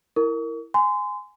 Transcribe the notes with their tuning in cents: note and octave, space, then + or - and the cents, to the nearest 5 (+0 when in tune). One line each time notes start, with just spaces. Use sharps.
E4 +0 A#4 -10 C#6 +40
G#5 +0 C6 -30